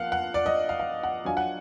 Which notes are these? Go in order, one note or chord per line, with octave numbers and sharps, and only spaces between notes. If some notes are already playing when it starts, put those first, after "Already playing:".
Already playing: F3 A#3 F5 F#5
F#5
D5
D#5
F5
F5
F#5
F#3 D4 F4 G#5
F#5